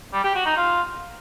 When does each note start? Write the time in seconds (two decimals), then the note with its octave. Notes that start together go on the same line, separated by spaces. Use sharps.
0.13 G3
0.24 G4
0.35 F#4
0.46 D#4
0.57 F4